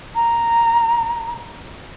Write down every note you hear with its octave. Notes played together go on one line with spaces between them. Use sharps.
A#5